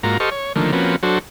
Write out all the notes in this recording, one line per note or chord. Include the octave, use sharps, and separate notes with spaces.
G#2 A#3 F4 F#4 A#5
G4 A4 C5 D#5 C#6 F6
C#5
D3 D#3 F3 A3 A#3
F3 A#3 C4 C#4 F#4 B4
F#3 D4 F#4 A4 C5